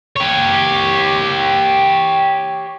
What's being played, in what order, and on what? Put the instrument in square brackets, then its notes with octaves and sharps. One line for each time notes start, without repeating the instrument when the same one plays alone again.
[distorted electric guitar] G4 C#5